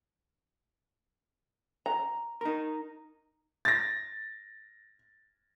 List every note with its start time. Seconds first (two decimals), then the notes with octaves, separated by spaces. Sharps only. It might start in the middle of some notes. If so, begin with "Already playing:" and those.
1.86 A#5
2.41 D#4 A#4
3.65 A6 A#6